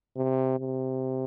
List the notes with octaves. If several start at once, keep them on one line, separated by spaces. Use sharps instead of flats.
C3
C3